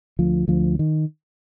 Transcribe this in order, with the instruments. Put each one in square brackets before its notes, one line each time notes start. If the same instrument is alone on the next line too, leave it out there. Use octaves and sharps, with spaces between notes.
[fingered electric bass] D2 F3
D2 F3
D#3